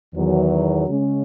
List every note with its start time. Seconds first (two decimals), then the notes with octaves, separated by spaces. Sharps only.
0.13 E2 D#3 F#3
0.87 C#3 G#3 C#4